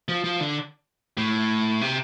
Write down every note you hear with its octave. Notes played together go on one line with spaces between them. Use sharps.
F3
F3
D3
A2
C3